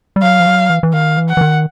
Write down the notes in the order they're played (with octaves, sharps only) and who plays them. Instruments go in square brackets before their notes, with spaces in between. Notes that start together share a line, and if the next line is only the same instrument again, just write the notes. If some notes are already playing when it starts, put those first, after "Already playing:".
[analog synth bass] G3
[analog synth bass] F#3 [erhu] F5
[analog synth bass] F3
F#3
E3
E3
[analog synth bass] D#3 [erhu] F5
[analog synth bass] E3
[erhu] F#5
[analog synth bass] E3
D#3